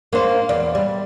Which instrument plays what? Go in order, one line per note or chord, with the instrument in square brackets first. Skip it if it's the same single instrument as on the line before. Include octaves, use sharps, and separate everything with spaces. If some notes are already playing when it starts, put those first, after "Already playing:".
[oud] A#3 D4 C5
E2 D5
G3